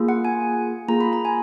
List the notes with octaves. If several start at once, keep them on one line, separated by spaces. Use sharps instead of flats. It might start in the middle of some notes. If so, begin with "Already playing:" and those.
Already playing: A#3 F4 G#4
F#5
G#5
A#3 F4 G#4 A#5
B5
A#5
G#5